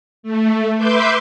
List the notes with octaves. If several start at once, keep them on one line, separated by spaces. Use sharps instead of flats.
A3
B4 E5 C6 D6 G6